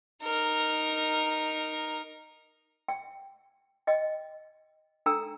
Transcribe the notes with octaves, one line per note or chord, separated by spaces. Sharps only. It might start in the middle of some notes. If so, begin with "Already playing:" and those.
D#4 A#4
G5
D#5 G5
D4 A4 G5 A#5 E6